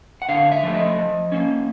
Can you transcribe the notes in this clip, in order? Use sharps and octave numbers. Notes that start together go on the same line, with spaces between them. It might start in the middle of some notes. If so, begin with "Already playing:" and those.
F#5
D3 F5
E5
F3 A3
D#5
F3
A#3 C#4